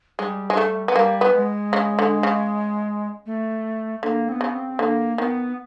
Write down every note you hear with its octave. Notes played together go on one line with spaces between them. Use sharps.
G3 G#3
G#3
A3
B3
G3 A#3
B3
G#3
C#3
D3
C#3
A3
D3 A#3
C4
B3
C#3
C4
D3 A#3
D#3 B3